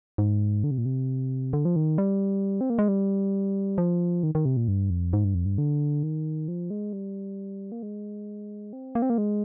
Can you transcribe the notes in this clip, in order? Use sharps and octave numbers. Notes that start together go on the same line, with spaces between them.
G#2
D3
C3
A#2
C3
D3
F3
D#3
G3
C4
A#3
G#3
G3
F3
D#3
D#3
C3
A#2
G2
F2
G#2
G2
F2
G2
D3
D#3
F3
G#3
G3
A#3
G#3
C4
A#3
C4
A#3
G#3